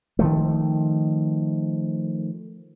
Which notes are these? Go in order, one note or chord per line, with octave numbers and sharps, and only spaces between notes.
D#3 F3 A3